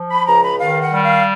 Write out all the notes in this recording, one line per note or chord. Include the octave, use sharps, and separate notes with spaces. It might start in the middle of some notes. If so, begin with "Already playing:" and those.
Already playing: F3
B5
C#2 A#5
B5
D#3 F5
F#5
G3
F5